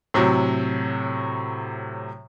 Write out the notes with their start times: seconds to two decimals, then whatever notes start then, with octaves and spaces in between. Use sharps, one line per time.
0.14 A2 C3 F#3